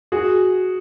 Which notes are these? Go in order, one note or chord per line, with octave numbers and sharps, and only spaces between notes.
F#4 G#4